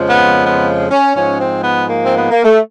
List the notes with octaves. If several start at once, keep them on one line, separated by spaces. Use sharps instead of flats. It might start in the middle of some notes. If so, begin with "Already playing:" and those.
Already playing: F2 C#3 F3 G#3
B3
B3
C#4
G#2 F3 G#3 C#4
C4
B3
A#3
C4
B3
A#3
A3